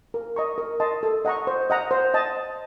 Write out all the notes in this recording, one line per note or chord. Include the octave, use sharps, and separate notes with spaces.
A#4
D#5 A#5 C#6
A#4
D#5 A5 C6
A4
D#5 F#5 A#5 C#6
C5
D#5 F#5 A#5
C5
D#5 A5